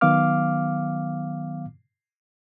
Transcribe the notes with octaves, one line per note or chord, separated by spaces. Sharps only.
D#3 F#3 B3 F5 D6 F6